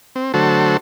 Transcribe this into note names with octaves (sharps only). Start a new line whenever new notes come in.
C4
D3 F#3 A3 F#4 A4 C5